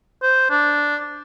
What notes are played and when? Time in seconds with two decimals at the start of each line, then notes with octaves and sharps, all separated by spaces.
0.22 C5
0.50 D4